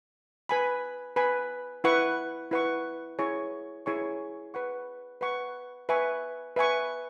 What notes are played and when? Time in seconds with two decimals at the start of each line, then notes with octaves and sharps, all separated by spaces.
0.49 B4 G#5 B5
1.16 B4 G#5 B5
1.84 E4 B4 F#5 C#6
2.51 E4 B4 F#5 C#6
3.19 E4 G#4 C#5 G#5 C#6
3.86 E4 G#4 C#5 G#5 C#6
4.54 B4 F#5 C#6
5.21 B4 F#5 C#6
5.89 B4 E5 G#5 C#6
6.56 B4 E5 G#5 C#6